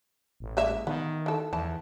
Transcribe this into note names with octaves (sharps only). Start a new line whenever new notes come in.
A1
G#3 A#3 E5
D#3 B3
E3 A4
E2 E3 A5